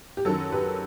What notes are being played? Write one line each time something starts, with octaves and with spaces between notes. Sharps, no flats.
G4
F#2 D#3 F#3 A4
G4 B4